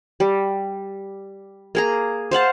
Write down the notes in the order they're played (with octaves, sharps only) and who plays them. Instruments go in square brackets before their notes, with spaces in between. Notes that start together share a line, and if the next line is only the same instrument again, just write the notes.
[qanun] G3
A#3 G#4 A#5
C5 F5 F#5 A5